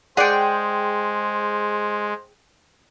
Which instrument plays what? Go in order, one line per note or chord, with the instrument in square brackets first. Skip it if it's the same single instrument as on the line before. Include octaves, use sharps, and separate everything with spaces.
[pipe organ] G#3 [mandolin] G#4 G5 [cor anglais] C5 [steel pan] D5 F#5